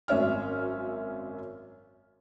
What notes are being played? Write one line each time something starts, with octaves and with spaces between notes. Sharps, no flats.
G#1 F#2 C#4 E5 F6